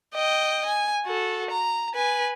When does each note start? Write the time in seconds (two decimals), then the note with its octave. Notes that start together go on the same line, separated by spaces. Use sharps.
0.15 D#5 G5
0.65 G#5
1.06 F#4 A4
1.50 A#5
1.95 B4 G#5